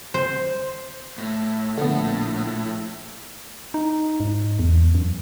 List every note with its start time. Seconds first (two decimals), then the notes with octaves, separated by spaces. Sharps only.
0.14 C5
1.18 A2
1.78 A#1 A2 D3 B3
3.74 D#4
4.20 G#2
4.59 E2
4.95 F#2